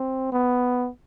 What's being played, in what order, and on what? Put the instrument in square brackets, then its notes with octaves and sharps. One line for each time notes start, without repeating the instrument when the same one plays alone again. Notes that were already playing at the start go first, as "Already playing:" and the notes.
Already playing: [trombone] C4
B3